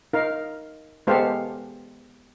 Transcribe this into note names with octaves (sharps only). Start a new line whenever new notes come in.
D#4 A#4 F5
G#3 B3 G4 A4 C5 F5